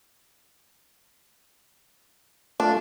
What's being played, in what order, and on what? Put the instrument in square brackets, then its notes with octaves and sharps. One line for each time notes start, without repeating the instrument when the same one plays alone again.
[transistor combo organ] A3 F4 [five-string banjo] D4